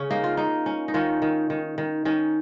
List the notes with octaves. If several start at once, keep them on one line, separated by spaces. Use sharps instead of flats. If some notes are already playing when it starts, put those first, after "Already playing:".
Already playing: C#3 C#4
A#3 D#4
F4
A#3 D#4
C#4
D#4
D#3 C#4 F4
D#3
D#3
D#3
D#3 C#4